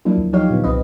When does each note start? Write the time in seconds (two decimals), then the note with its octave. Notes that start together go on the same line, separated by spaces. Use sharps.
0.05 F3 F#3 A#3 D4 E4
0.18 D2
0.33 F3 F#3 D#4 G4 C#5 F5
0.50 A#2 D3 B3
0.64 C2 C4 B4 D#5